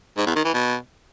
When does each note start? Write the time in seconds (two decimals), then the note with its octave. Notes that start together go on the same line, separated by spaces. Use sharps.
0.17 G#2
0.26 E2
0.36 D#3
0.45 E3
0.54 B2